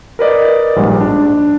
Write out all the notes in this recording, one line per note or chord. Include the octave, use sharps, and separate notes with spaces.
A#4 B4 D5 D#5
A#1 G#2 G3
D4